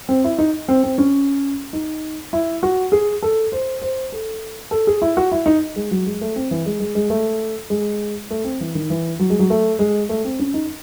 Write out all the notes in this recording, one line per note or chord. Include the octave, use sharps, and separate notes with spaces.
C4
E4
D#4
C4
C4
C#4
D#4
E4
F#4
G#4
A4
C5
C5
A4
A4
G#4
E4
F#4
E4
D#4
G#3
F#3
G#3
A3
C4
E3
G#3
G#3
G#3
A3
G#3
A3
C4
E3
D#3
E3
F#3
G#3
F#3
A3
G#3
A3
C4
C#4
D#4